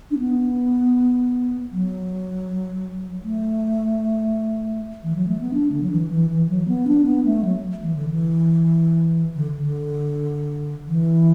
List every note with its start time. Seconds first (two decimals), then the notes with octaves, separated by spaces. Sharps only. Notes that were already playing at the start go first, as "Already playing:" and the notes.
0.11 D4
0.19 B3
1.72 F#3
3.24 A3
5.03 E3
5.16 F#3
5.28 A3
5.41 B3
5.54 D4
5.72 D3
5.82 F#3
5.91 E3
6.11 E3
6.30 E3
6.49 F#3
6.68 B3
6.87 D4
7.06 B3
7.25 A3
7.45 F#3
7.82 E3
7.96 D3
8.10 E3
9.35 D3
9.57 D3
10.87 E3